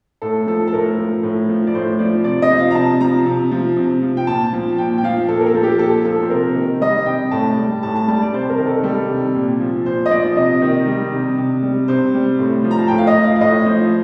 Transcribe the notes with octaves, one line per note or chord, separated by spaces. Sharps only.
A2 A4
F3 A4
A4
A2 A#4
F3
A2
F3
D5
A2 C5
F3 D5
C3 D5
D#5
F3
F5
A#5
C3 A5
F3 A#5
C3
F3
C3
F3
G5
A#2 A5
F3
A#2 G5
G5
F3 F5
A#2 A4
A#4
A4
F3
G4
A#2 A4
F3 A4
C5
C3 A#4
D#3
G3 D#5
C3 G5
A2 A5
G3
A2 A5
A5
G3 A5
D5
C3 C5
A#4
D#3
A4
G3 A4
C3
A#2
F3
A#2 C5
D#5
F3 D5
C3 D#5
D#3
G3
C3
C3
G3
C3 C5
G3
A2
F3
A#5
A5
A2 G5
F5
D#5
F3
F5
F5
A2 D#5
F3 C5